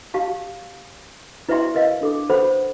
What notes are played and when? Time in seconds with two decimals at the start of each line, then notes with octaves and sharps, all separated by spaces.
0.14 G4 F5 A5
1.49 E4 B4 D5 E5 G5 C6
1.74 A#4 B4 D#5 F5
2.01 D4 A4 D6
2.30 A4 B4 C5 F#5 G5 B5